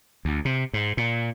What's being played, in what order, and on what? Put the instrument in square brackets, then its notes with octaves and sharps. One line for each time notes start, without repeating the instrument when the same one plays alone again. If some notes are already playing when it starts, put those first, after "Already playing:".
[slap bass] D2
C3
G#2
A#2